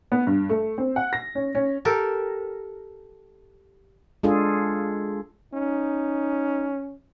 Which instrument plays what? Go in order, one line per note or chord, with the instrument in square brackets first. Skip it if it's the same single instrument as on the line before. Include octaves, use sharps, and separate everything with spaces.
[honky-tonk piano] B3
G2
A3
C4
F#5
A#6
C#4
C#4
[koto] G4 A4 A#4
[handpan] G#3 D4 F4 G#4 A4
[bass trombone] C#4 [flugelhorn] D#4